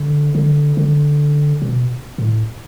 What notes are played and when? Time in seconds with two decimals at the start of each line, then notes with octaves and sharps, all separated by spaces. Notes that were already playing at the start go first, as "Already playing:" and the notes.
Already playing: D3
0.35 D3
0.77 D3
1.62 B2
2.18 A2